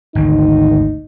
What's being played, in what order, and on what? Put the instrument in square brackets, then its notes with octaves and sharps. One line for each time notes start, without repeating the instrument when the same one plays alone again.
[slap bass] G#1 D2 [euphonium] D#4